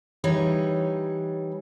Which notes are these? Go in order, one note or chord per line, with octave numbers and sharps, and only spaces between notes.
E3 G3 D#4 C#5